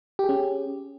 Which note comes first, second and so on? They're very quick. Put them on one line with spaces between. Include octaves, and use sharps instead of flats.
G4 G#4 C#4